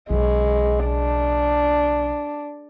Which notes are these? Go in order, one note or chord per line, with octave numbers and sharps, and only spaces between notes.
B1 C#3 G#3
D4